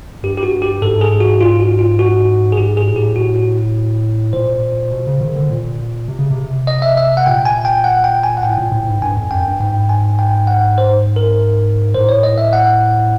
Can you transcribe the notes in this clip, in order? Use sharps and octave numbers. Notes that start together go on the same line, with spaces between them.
G2 G4
G4
F#4
G4
G#2 A4
G#4
F#4
F4
F#4
F4
F#4
G#4
G#2 G4
G#4
A2
G4
A2 F#4
F#4
A#2 C5
B2
C#3
D#3
D3
A#2
C3
C#3
C3
D#5
E5
E5
F#5
A#2 G5
G#5
G5
F#5
G5
G#5
F#5
A2 G5
A#2
A2
G#2
G2 G#5
F2
F#2 G5
G2
G#2 G5
G#5
G5
F#5
C5
A#4
A2 C5
C#5
D#5
E5
F#5